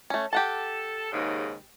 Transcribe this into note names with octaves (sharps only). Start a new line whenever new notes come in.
A3 C#4
G4 A4 F#5 A5
D#2 G#2 C#3